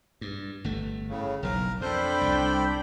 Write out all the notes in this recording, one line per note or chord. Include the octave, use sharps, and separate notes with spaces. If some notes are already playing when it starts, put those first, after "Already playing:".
G2
G1 A3
A2 C#3
F#1 B1 A#4
F2 D4 A4 C5 G5 B5
C2